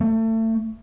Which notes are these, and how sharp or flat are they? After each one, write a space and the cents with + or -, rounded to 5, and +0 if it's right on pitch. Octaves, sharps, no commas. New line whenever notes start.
A3 +30